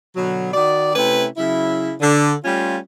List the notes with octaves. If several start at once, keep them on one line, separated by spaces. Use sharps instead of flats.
B2 D3 F#3
D#3 F#4 D5
C3 A3 C#4 E4 B4
C#3 F#3 E4
D3
G3 A3 C#4 F4